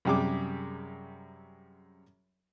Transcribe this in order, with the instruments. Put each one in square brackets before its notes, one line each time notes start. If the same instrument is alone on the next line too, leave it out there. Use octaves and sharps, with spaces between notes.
[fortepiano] F#2 C3 G3 G#4 D6